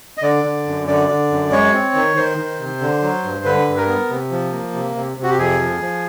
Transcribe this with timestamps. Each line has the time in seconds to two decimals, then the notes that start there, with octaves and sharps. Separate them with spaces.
0.18 D#5
0.23 D3 D5
0.44 D3
0.66 F#2
0.88 D3 D5
1.08 D3
1.31 F#2
1.52 G#3 C#5
1.73 C4
1.95 D#3
2.17 D#3 C5
2.38 D#3
2.59 C3
2.81 D3
3.02 F#3
3.24 G2
3.45 D3 B4
3.67 G2
3.77 A#4
3.88 B3
4.10 C3
4.31 F3
4.52 A#3
4.74 C3
4.96 C3
5.18 C3
5.23 F#4
5.30 G4
5.38 F2 G#4
5.60 F3
5.81 F3